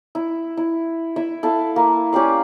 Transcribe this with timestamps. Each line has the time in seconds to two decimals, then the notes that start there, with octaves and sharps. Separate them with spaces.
0.15 E4
0.57 E4
1.16 E4 E5
1.43 E4 A4 F5
1.76 A#3
2.12 C#4 G4 D5 F5